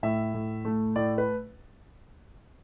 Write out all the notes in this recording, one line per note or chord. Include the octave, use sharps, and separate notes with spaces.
A2 E5
A2
A3
A2 D5
B4